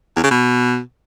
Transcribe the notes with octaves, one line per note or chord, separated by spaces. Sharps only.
E2
C#3
B2